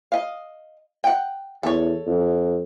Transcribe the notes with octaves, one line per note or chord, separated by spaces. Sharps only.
D#5 F5
F#5 G5
E2 A4 C#5
F2